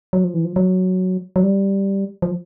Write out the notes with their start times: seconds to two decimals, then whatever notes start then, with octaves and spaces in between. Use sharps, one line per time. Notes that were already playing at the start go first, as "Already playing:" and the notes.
0.13 F#3
0.24 F3
0.34 E3
0.45 F3
0.56 F#3
1.36 F#3
1.43 G3
2.22 F3